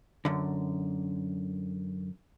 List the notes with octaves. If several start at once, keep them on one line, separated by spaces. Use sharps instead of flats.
F#2 D3